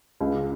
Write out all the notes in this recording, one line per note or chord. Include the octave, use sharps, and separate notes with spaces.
C#2